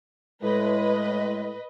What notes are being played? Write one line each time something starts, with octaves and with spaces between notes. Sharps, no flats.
A2 G#3 B4 D#5